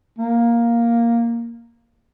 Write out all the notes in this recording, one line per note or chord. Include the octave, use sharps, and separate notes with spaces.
A#3